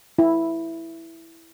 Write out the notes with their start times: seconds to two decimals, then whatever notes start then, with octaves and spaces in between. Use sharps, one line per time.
0.19 E4